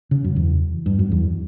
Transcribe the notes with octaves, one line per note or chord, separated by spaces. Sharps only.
C#3
F#2
E2
G2
F#2
E2